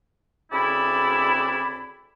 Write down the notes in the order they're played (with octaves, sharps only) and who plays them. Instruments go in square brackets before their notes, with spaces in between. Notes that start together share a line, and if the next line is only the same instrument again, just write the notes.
[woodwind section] D2 C#3 C4 E4 D5 B5